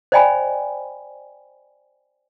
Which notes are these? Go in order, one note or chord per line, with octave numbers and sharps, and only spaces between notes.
C5 D5 D#5 G5 G#5 B5